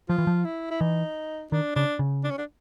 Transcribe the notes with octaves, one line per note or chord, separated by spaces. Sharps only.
F3 F4
E3
F3
E4
E4
E3 D#4
D#3 D4
C#3 D4
C#3
D4
C#4
D4